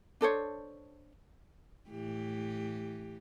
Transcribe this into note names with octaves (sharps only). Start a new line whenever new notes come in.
D4 A4 C5 C#5
A2 E3 G4